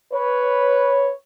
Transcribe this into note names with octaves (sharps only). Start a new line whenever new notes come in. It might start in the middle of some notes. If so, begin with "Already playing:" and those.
B4 C#5